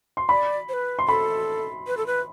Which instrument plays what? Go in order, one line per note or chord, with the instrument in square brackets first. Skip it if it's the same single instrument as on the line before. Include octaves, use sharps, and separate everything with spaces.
[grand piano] C6
[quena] D5 [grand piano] B5
[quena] C5
B4
[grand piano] C6
[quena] A4 [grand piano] B5
[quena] B4
A4
B4